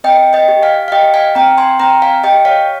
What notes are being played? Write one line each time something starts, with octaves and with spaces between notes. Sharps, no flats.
C4 D#5 G5
D#5 G5
G4
F5 G#5
F5
G4 D#5 G5
F5 G#5
C4 G5 A#5
G#5 C6
C4 G5 A#5
F5 G#5
G4 D#5 G5
C#5 F5